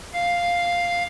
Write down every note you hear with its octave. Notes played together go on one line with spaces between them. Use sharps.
F5